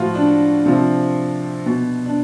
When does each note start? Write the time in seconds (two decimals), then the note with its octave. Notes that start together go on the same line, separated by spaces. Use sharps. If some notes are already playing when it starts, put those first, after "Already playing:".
Already playing: A2 F3 F4 F#4
0.15 D4
0.66 C3 F3
1.66 B2
2.06 D4